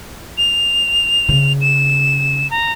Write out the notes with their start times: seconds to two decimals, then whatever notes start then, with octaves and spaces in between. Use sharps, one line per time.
0.38 F7
1.29 C#3
1.61 E7
2.51 A#5